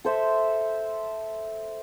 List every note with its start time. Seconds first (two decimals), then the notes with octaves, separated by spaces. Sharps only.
0.05 A4 C5 E5